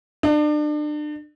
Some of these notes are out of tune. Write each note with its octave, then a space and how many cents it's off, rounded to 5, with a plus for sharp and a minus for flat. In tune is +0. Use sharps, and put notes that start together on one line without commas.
D4 +35